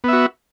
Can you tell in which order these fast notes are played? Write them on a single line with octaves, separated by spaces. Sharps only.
B3 E5 F#4